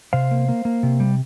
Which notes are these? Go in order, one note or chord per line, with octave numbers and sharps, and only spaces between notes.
C3 C5 F5
A#3
A#3
A#3
C3
G3